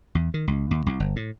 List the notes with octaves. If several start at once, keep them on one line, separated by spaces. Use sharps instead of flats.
E2
D#3
C#2
D#2
C2
G1
A2